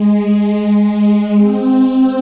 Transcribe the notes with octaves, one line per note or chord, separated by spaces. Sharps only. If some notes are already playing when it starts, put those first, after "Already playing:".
Already playing: G#3
C4